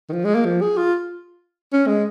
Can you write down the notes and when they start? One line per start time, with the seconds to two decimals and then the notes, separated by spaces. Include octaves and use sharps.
0.09 D#3
0.13 F3
0.25 G#3
0.35 A#3
0.45 F3
0.62 G#4
0.78 F4
1.73 C#4
1.88 G#3